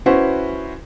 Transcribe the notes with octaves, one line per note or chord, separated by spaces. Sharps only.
C#4 E4 F#4 B4 C5